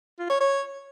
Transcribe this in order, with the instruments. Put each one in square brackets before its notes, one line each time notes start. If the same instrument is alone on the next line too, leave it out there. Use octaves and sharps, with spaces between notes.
[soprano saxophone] F4
C#5
C#5